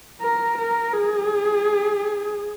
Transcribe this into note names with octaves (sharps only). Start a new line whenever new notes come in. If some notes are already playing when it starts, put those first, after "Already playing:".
A#4
A#4
G#4